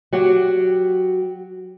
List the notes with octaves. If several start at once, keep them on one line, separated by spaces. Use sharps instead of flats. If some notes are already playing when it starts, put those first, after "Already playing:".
F#3 F#4 G4